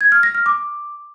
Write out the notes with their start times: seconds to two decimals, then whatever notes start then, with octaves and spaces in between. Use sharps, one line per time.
0.01 G#6
0.12 F6
0.23 A#6
0.35 F6
0.46 D6